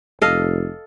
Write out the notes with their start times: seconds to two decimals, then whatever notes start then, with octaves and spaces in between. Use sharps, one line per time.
0.22 F1 A4 D#5 F5